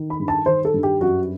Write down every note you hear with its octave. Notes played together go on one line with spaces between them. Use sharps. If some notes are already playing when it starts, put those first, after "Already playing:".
Already playing: D#3
B5
G2
A5
D#3 C5
A4
G2
G4
F#2 F#4